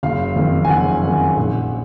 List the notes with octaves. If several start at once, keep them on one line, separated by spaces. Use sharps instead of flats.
F#1 F5
F2 D#3
G#5
F#1 F#5
F2 D#3
A#1